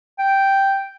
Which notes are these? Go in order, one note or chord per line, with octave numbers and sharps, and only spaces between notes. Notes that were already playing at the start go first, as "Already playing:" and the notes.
G5